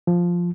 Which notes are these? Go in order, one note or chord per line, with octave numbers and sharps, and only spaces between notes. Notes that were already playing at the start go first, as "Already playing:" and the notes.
F3